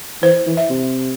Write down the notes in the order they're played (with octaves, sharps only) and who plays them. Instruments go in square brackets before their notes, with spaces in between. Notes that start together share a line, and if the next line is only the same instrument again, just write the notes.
[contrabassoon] E3 [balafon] C5
[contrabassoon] E3
[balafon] E5
[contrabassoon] C3